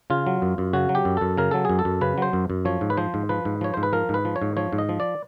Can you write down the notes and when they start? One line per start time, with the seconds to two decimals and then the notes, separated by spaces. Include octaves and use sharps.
0.10 C#3 F4
0.27 F#3
0.42 F#2
0.58 F#2
0.73 C#3 F#4
0.89 F#3
0.95 G4
1.05 F#2
1.17 F#2 A4
1.37 C#3 A#4
1.51 F#3 A4
1.65 F#2 G#4
1.79 A4
1.85 F#2
2.01 C#3 B4
2.18 F#3 C5
2.33 F#2
2.50 F#2
2.65 F3 C#5
2.81 G#2
2.90 B4
2.97 F3 C5
3.14 G#2
3.29 F3 B4
3.45 G#2
3.61 F3 C#5
3.74 G#2 C5
3.83 B4
3.93 F3 A#4
4.09 G#2
4.14 B4
4.25 F3
4.36 C#5
4.42 G#2
4.57 F3 C#5
4.72 G#2
4.78 D#5
4.89 F3
5.00 D5